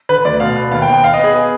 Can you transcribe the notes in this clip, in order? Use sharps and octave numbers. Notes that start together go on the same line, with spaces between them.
D3 B4
D2 D5
B2 F5
B3
D#2 F5
G5
D#2
G5
B3 F5
D#5
B3 G#4
G#4